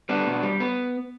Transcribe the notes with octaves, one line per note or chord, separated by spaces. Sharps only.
G3 B3 D4
B2
G3
B3